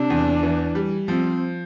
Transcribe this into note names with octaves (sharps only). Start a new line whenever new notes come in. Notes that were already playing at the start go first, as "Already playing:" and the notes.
Already playing: C3 D4
E2
E3
G3
F3 C4